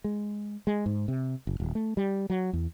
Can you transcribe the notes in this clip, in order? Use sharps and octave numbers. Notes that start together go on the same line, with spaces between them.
G#3
G#3
G#2
C3
F#1
D#1
A3
G3
F#3
E2